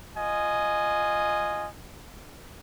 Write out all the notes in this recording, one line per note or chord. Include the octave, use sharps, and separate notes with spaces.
F4 D#5 G#5